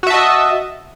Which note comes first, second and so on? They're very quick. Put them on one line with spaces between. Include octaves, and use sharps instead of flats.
F#4 E5 A5 D#5